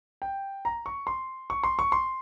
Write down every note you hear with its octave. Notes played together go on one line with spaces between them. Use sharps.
G5
A#5
C#6
C6
C#6
C6
C#6
C6